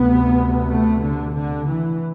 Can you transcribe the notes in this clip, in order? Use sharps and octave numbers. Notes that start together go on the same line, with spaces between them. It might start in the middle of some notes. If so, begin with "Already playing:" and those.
Already playing: D2 C3 B3
A3
D3
D3
E3